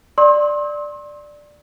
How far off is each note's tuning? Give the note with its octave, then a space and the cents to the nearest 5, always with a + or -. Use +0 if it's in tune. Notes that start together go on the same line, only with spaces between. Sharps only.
D5 +5 C6 +35 E6 -40